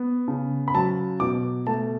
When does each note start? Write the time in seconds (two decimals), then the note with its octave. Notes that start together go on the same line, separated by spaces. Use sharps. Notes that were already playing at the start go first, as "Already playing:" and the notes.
Already playing: B3
0.28 C#3
0.68 B5
0.74 F#3 A5
1.20 B2 D6
1.67 A3 A5